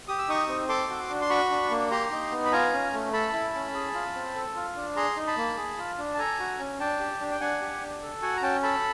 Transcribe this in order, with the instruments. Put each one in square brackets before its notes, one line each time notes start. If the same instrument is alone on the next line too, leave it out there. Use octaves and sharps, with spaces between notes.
[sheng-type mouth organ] G4 D#6
E6
D#4 C#6 D#6
C4
A4 C6 D6
F#4
D4
C6
F#4 B5 C#6
D4
A#3
G4 A#5 C6
D#4
B3
B5
F4 G#5 A#5
C#4
A3
A4 A5 B5
E4
C#4
G#4
F4
C4
A4
F4
D4
G#4 A#5 C6
D#4
A5 B5
A#3
G#4
F4
D4
A5
A4 G#5 A#5
F#4
C#4
D4 G5 A5
G4
D4
G5
D4 F#5 G#5
G4
D4
A4
F#4 F#5 G#5
A#5
C#4 G5 A5
A4 A5 B5